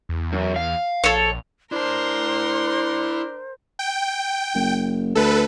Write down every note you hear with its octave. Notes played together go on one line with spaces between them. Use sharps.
E2
F#2
F5
A#1 A4 C#5
D4 E4 A#4 C5 A5 C6
G5
F#1
D2 A4 B4